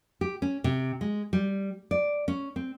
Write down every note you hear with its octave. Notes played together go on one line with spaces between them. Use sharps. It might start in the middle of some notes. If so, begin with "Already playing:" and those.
G4
C#4
C3
G#3
G3
D5
C#4
C4